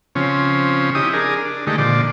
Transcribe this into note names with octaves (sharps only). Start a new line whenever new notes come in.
C#3 F3 C4 C#4
D#4 E4 G4 D#6
D4 G#4 A#4
D4
D3 D#3 G#3 A3 D#4 G4
A#2 D3 F3 D5